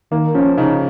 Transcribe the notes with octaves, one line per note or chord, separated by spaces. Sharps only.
D#3 A#3
F3 C#4
C#3 D#4